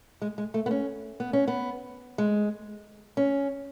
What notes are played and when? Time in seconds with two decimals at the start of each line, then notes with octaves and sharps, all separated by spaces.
0.22 G#3
0.38 G#3
0.54 A3
0.66 B3
0.71 C#4
1.20 B3
1.33 C#4
1.48 B3
2.18 G#3
3.17 C#4